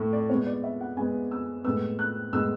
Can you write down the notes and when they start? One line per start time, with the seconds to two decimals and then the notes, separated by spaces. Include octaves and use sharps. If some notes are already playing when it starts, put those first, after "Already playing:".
Already playing: A2 A3
0.13 D5
0.29 B2 G#3 B3 C#5
0.47 D5
0.64 E5
0.81 F#5
0.96 B2 G#3 B3 G#5
1.31 E6
1.64 A2 G#3 B3 E6
1.99 F#6
2.33 A2 G#3 B3 E6